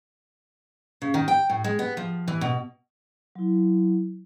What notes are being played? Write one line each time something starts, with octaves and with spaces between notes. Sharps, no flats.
C#3
D#3
G5
A2
G#3
B3
F3
E3
B2
F#3 E4